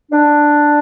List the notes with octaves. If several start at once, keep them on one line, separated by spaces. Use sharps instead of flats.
D4